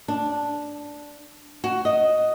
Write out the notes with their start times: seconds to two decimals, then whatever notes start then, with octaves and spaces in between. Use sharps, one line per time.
0.08 D4
1.64 F#4
1.85 D#5